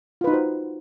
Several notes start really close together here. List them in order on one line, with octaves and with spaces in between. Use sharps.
F4 B4 D#4 F#4 C5